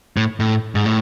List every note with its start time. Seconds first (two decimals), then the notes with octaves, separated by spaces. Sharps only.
0.17 A2
0.40 A2
0.75 G#2
0.86 A2